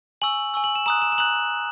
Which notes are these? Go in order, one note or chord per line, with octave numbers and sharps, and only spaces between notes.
G#5 C#6 E6 F#7
G#5 C#6 E6
F#7
E7
A#5 D#6 F#6 E7
E7
E7
A#5 D#6 F#6 F#7